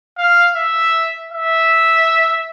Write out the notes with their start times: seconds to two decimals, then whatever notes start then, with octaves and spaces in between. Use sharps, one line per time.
0.18 F5
0.55 E5
1.32 E5